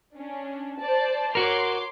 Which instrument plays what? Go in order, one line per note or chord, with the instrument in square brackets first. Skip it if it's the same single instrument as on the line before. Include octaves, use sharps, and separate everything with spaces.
[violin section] C#4 D4
C5 D5 A5
[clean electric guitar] F#4 A#4 [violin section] C#5 C6 D6